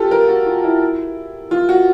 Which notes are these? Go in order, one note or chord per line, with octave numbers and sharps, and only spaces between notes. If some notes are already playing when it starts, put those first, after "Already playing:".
Already playing: F4 G4 A4
A#4
F#4
F4
E4
F4
F#4